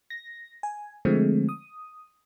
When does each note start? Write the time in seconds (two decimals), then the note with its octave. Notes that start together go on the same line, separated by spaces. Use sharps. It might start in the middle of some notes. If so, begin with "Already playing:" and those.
0.10 A#6
0.63 G#5
1.05 D3 F3 G#3 A3 C4
1.49 D#6